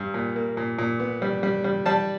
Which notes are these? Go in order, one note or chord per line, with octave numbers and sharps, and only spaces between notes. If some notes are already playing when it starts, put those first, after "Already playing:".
Already playing: G2
A#2
A#3
A#2
A#2
B3
G3
G3
G3
G3 A5